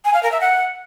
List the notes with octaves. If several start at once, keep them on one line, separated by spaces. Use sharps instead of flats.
G#5
F5
A#4
E5
F#5